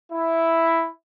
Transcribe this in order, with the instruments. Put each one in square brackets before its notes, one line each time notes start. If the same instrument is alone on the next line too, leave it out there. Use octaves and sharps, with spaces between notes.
[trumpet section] E4